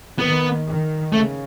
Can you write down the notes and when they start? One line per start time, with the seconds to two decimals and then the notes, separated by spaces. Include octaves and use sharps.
0.19 D#3 B3
0.66 D#3
1.13 C#3 A3